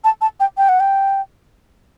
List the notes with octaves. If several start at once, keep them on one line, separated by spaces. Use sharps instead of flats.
A5
A5
G5
G5
F#5
G5